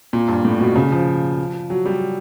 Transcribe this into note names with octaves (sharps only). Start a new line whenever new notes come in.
A#2
G2
A2
B2
C#3
F3
F#3
G3